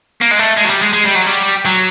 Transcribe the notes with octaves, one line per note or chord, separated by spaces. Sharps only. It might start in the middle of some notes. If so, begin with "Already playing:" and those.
A#3
G#3
A3
G#3
F#3
G3
G#3
G#3
G3
F#3
G3
F#3